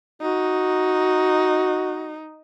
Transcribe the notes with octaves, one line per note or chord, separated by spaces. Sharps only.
D#4 F#4